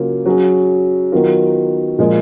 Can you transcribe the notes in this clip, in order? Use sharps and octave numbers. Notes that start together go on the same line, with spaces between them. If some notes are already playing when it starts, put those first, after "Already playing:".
Already playing: C#3 F#3 A#3 F4
F#3 C#4 G#4
D#3 F#3 B3 F4 A#4
A#2 F3 G#3